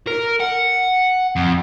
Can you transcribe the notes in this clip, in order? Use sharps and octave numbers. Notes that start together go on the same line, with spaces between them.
A#4
F#5
F2